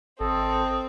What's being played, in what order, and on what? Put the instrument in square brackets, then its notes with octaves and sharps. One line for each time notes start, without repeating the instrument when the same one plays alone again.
[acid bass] G#1 [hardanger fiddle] C4 [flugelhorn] A4 [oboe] D#5